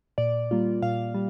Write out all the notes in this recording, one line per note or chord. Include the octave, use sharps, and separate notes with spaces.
A#2 D5
G3 A#3 F4
A#2 F5
G3